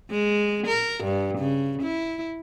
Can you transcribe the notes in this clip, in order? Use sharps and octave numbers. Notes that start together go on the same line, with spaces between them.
G#3
A#4
G2
C#3
E4